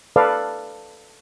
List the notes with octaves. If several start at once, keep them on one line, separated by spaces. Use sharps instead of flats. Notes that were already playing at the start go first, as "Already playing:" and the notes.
A4 B4 D5 F5